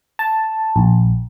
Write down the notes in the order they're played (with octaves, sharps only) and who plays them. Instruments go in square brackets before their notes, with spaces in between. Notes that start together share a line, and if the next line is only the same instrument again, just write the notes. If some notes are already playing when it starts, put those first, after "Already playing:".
[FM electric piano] A5
A#1